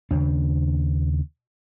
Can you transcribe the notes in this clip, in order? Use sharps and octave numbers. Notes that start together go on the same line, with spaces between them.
D#2 C#3 D4